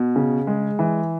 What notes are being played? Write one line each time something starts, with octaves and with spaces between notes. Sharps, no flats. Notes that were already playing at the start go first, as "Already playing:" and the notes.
Already playing: B2
C#3
G#3
E3